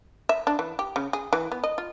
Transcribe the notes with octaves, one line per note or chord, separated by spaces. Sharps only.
E5
D4
E3
G4
C#3
G#4
E3
B3
D#5
F4